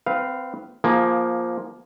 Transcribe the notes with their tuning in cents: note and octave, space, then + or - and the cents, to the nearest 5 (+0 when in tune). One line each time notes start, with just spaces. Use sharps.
C4 -25 B4 +0 F5 +0
F3 +0 A#3 +10 G#4 +0